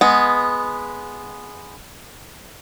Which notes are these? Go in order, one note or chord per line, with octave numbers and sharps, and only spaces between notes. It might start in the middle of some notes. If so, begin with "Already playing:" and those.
G#3 B3